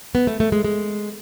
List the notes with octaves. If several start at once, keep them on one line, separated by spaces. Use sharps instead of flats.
B3
A3
A3
G#3
G#3